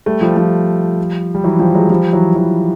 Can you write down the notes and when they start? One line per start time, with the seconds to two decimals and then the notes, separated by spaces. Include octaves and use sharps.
0.06 G3 A3
0.21 F3 G3
0.37 F3 G3
1.35 G3
1.44 E3 F#3
1.59 F3 G3
1.75 F#3 G#3
1.90 F3 G3
2.13 E3 F#3
2.36 E3 F#3